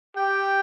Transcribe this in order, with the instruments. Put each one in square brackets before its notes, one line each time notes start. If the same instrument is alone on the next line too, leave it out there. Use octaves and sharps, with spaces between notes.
[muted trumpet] G4 [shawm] G5